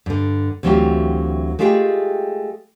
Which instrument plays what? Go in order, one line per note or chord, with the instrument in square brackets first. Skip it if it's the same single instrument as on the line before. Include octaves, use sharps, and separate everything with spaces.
[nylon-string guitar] G2 D3
D2 E3 F#3 C4 F4 G4
G#3 A3 F4 G4 G#4 G5